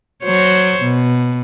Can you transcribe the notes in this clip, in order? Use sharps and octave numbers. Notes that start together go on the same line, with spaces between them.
F#3 C5 C#5
B2